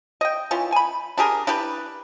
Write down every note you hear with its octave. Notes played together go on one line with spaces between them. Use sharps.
D#5 G5
E3 C#4 F4
G#5 B5
D4 G4 G#4 A#4
D4 E4 G4 B4